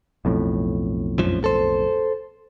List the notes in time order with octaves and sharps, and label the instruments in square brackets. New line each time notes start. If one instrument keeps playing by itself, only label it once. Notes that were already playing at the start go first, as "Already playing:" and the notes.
[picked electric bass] B1 F2 A2
[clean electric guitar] F#2 F3
A4 C5